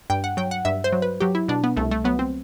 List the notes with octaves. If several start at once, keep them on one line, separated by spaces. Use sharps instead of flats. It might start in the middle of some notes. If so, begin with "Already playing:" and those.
G2 G5
F#5
F#3 G5
F#5
G2 E5
C5
F#3
B4
F#3 G4
E4
B2 D4
B3
C2 A3
A3
F#3 B3
C4